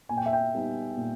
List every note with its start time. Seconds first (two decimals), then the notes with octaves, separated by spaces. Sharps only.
0.09 A#2 G#5
0.17 G5
0.26 E5
0.33 G5
0.54 G3 B3 D#4
0.97 A#2